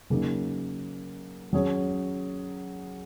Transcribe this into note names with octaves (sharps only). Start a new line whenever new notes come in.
C#3 F#3 A#3 D#4
F#3 C#4 G#4 C#5